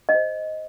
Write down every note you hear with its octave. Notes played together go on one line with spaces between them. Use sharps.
D#5
C5